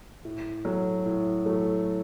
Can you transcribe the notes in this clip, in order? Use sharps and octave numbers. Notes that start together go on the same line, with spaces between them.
A2
F#3 A3
A2
F#3 A3